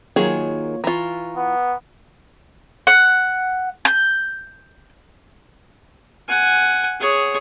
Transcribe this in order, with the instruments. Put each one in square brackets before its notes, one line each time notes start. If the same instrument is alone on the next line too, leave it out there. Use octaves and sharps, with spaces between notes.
[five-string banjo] D#3 F#3 G#4 [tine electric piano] A#3 F4 C#5
[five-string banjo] E3 F4 [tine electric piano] A#5 C#6
[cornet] B3
[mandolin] F#5
G6
[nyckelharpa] F#5 G#5
G#4 C#5